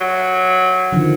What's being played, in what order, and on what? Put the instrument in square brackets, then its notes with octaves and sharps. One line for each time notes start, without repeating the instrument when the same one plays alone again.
[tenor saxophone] F#3
[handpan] D3 D#3 F3